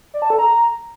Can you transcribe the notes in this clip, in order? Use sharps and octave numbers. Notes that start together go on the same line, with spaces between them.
D5
A5
A4
A#5